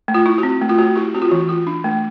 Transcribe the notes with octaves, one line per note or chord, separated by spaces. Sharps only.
A3
F4
E4
F#4
C4
A3
F4
A3 F#4
E4 G4
C4 F#4
F4
E3 F#4
F4
D4
A3